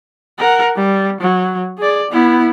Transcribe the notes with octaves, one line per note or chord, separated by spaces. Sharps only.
A#4 F#5
G3
F#3
G#4 D5
B3 E4